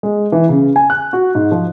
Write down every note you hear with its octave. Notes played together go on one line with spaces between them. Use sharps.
G#3
E3
C#3
G#5
F#6
F#4
G#2
F3